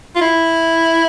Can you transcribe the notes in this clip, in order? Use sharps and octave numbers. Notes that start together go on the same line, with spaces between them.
F4
E4